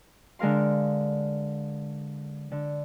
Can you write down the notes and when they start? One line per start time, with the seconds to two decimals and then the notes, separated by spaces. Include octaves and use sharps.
0.39 D3 G#3 A#4 F5 C6
2.52 D3